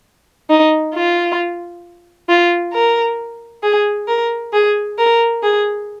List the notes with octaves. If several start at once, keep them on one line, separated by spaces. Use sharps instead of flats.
D#4
F4
F4
A#4
G#4
A#4
G#4
A#4
G#4